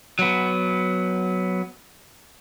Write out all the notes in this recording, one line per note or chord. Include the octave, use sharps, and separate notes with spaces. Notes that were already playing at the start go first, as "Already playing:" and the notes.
F#3 B3